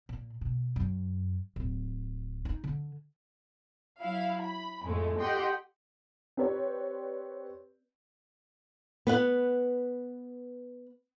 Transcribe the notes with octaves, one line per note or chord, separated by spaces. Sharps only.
A#2
B2
F#2
D1
D#4
D3
F#3 E4 F5
B5
F2 A2 G#3 A3
G4 A4 D#5 F#5 G5 C6
C4 G4 B4 C#5 D5
B3 B4 F#5